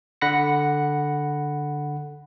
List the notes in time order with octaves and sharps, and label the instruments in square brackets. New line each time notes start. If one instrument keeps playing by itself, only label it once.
[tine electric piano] D3 F#5 B5 A#6 C#7